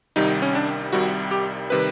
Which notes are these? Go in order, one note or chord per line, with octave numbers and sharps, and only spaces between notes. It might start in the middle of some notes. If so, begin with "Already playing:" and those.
C2 C3 D#3 G3 D#4
C#4
D4
C2 C3 D#3 G3 F#4
G4
C3 D#3 G3 B4